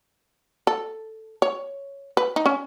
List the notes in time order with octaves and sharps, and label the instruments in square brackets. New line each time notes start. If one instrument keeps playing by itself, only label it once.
[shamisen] A4
C#5
B4
D#4
C#4